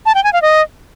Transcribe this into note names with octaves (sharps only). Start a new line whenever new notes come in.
A5
G5
G#5
F5
D#5